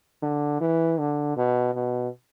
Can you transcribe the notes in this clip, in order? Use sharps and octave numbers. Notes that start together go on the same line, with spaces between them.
D3
E3
D3
B2
B2